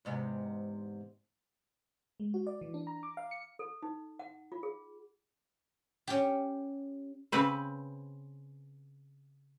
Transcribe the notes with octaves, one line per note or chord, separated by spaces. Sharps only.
E2 G#2 C3
G#3
F#4
D5
E3
D4
A#5
D6
F5
C#7
A4
D#4
F#5
F4
G#4
C#4 G4
C#3 C4 B4 C5